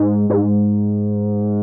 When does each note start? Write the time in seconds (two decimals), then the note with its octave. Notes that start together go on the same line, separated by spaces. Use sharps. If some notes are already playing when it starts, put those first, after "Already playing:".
Already playing: G#2
0.30 G#2